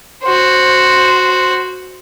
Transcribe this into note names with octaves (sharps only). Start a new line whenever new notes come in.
F#4 C5